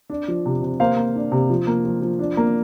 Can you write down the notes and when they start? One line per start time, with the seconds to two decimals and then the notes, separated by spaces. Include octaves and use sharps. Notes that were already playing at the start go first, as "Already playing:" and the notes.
0.10 D4
0.28 F3
0.46 C3
0.63 C3
0.80 A#3 C5 F5
0.97 A#3
1.15 D4
1.32 C3
1.50 F3
1.67 A#3
1.85 F3
2.02 F3
2.19 D4
2.37 A#3